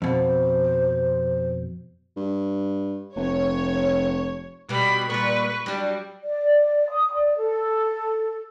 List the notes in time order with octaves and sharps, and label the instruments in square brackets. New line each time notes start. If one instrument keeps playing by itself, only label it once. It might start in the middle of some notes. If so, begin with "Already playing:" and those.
[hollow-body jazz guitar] F2 B2 [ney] C5
[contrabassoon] G2
[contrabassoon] F1 [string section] C#5
[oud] B2 B3 [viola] G3 B5
[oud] A#2 G3 [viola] B4 C#6
[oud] F#3 D4 [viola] G3
[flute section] D5
D#6
D5
A4